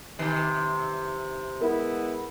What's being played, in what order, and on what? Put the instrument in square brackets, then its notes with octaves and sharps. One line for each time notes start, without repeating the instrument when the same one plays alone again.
[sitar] C3 D#3 E3
[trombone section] G#3 B3 E4 [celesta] A#4